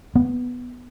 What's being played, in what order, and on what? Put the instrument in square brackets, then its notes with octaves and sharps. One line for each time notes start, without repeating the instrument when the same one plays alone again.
[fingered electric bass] B3